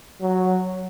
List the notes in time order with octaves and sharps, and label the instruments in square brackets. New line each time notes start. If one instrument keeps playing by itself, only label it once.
[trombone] F#3